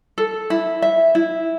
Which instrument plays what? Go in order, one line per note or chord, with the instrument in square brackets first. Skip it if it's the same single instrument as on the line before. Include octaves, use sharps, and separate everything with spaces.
[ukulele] A4
E4
E5
E4